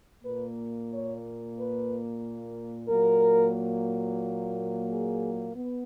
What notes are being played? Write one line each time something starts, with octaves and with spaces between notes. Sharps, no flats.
A#2 A#3 B4
C#5
B4
A#2 F#3 A#3 A#4
G#4
B3